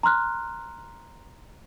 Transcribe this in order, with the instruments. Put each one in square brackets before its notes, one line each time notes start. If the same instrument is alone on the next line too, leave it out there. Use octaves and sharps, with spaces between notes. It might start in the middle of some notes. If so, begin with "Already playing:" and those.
[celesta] A#5 C6 F6 F#6